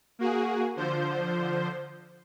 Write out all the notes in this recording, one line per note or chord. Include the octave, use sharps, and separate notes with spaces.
A#3 F#4 G#4
D3 F3 C5 G6